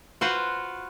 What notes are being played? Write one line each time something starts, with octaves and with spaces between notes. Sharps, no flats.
F4 F#4 B4 C5